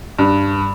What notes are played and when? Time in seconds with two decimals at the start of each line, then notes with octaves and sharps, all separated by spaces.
0.19 G2